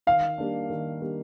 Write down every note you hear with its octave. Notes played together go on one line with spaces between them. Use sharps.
D#3 F5
G3 A#3 D4
D#3
G3 A#3 D4